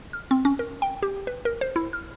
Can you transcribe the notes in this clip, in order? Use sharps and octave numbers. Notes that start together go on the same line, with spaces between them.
F6
C4
C#4
A#4
G5
G4
B4
A#4
C5
E4
F6